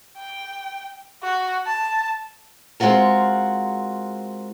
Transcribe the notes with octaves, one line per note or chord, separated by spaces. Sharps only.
G5
F#4
A5
G#3 C4 F4 F#4 A#4